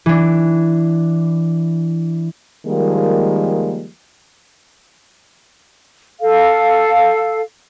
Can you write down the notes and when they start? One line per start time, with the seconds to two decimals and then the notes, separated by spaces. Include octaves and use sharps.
0.06 E3 D4
2.66 D#3 F3 G3 G#3 A#3
6.21 A4 F5